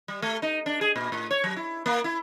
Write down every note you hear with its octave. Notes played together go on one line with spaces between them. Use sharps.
G3
A3
D#4
D4
G#4
A#2
A2
C#5
F#3
E4
A#3
E4